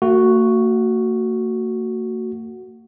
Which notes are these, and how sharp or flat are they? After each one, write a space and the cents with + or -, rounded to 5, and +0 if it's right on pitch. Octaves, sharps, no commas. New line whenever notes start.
A#3 -45 F#4 +0